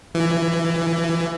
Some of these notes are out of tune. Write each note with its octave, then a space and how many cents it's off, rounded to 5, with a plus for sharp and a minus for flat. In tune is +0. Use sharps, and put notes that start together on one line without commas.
E3 +20